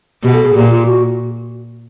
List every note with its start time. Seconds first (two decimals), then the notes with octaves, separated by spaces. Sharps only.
0.23 B2 G4
0.34 A4
0.44 G#4
0.55 A#2 G4
0.70 F4
0.86 F#4